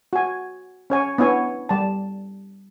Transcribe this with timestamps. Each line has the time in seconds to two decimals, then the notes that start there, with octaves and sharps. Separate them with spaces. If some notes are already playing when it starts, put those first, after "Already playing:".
0.13 F#4 G#5
0.90 C#4 C#5 G#5
1.18 B3 D4 E4 C#5 G#5
1.69 G3 A5